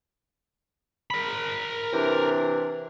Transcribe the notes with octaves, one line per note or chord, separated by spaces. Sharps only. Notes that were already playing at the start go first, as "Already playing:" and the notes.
A#4 B5
C3 E3 D4